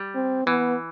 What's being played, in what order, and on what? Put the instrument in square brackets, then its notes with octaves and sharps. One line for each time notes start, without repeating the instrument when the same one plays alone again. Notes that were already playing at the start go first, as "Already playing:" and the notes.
Already playing: [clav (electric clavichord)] G3
[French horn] C4
[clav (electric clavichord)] E3 [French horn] B3